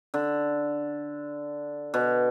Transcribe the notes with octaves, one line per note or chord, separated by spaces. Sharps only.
D3
B2